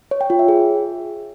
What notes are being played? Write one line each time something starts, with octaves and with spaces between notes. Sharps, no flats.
C#5
G5
F4
E5
G#4